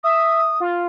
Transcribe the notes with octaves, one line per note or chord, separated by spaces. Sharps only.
E5 D#6
F4